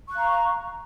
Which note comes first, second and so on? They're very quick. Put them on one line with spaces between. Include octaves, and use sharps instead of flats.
C#6 F#6 F5 A#5